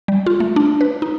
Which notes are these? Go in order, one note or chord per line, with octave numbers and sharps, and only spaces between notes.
G3
F4
A3
D4
B4
D#4